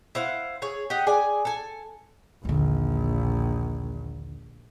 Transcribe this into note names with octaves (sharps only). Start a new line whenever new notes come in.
E4 C5 F5 F#5
G#4 C#5
G4 D#5 F#5
G#4 D5 G#5
A4 G#5
A#1 D#2 D3